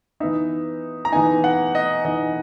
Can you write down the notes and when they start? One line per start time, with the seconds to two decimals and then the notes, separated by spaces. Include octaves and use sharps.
0.20 E3 B3 D#4 E5
1.05 A#5
1.12 E3 B3 D#4 G#5
1.44 F#5
1.75 D#5
2.05 E3 B3 D#4 D#5